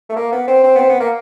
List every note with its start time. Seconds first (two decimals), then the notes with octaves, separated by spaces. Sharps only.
0.09 A3
0.16 A#3
0.32 B3
0.48 C4
0.63 C4
0.75 B3
0.79 C4
0.90 B3
1.00 A#3